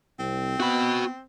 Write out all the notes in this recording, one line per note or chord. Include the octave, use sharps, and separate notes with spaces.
C2 C4
B3 F#4 B5